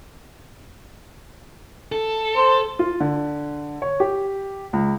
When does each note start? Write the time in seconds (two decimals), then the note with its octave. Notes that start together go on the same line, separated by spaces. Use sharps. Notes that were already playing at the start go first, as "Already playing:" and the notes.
1.92 A4
2.36 C5
2.79 F4
3.00 D3
3.82 C#5
4.00 G4
4.73 C#2